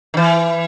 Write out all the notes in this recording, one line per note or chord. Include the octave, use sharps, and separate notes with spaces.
D#3
E3